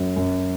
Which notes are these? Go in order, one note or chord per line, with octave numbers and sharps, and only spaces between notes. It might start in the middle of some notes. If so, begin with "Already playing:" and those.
Already playing: F#2 F#3
F#2